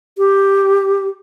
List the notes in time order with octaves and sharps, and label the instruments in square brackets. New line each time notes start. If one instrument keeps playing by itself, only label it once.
[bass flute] G4